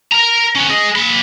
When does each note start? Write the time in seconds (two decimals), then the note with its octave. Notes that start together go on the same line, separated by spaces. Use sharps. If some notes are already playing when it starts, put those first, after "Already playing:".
0.12 A#4 A#5
0.55 B3 C#4
0.70 G#4 D#5
0.95 A#3 B5